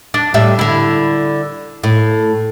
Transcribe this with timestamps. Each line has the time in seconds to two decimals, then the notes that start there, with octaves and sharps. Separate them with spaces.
0.14 D4
0.34 A2 G3 E5
0.59 D3 E4
1.83 A2